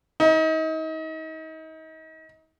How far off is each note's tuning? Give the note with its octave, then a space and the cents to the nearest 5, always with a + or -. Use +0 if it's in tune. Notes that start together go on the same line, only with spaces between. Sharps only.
D#4 +35